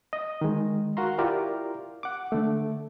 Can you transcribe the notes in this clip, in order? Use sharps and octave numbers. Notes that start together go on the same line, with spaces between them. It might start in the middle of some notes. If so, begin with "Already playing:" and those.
D#5
D#3 G#3
F#4 A#4 F5 A#5 C6
E4 F4 G4 A#4 D5
F#5 D6
D3 A3